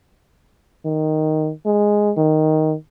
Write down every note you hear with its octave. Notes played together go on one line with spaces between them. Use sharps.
D#3
G#3
D#3